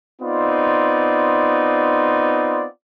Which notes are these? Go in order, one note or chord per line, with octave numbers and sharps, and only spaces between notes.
B3 C4 D#4 F4 D5